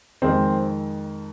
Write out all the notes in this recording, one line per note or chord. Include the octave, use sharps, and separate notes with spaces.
F2 D#3 G#3 C4